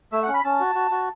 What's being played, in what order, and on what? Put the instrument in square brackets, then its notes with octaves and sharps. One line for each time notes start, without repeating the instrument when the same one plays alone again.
[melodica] A3 [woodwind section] E5
[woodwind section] F#5
[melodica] C#4
[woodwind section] B5
[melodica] C#4 [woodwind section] A5
[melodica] F#4
F#4
F#4